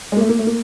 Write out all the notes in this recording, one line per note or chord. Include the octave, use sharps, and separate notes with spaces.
G#3
A#3
A3
A#3
A3
A#3